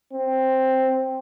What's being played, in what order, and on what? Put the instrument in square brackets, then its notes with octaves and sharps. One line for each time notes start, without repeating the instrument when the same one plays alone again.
[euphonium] C4